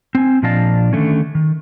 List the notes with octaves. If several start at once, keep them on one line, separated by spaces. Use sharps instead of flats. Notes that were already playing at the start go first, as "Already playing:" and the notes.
C4 G#5
A#2 F3 D4 D#5 F5 A5
D3 D#3 A3 C#4
D#3